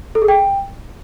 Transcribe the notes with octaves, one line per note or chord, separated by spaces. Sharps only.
A4
G#4
G5